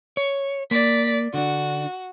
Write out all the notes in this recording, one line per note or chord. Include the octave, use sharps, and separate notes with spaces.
C#5
A#3 D5 B6
D3 D4 F#4